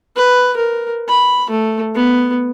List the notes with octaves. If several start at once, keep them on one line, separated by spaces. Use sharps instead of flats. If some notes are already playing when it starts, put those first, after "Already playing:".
B4
A#4
B5
A3
B3